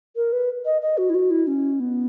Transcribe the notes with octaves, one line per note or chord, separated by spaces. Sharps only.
A#4
B4
D#5
D#5
F#4
E4
F#4
E4
C#4
B3